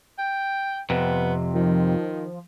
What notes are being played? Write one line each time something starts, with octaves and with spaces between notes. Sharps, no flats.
G5
F2 C3 B3
D#3 F3